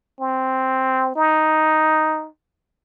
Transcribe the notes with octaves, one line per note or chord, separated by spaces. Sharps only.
C4
D#4